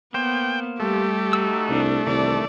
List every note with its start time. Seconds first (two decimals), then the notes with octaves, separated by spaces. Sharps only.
0.14 A#3 B3 C5 G5
0.80 G3 A3 G4
1.33 D#4 F#4 E6
1.69 C2 D4
2.07 C2 D#3 E3 D4 D5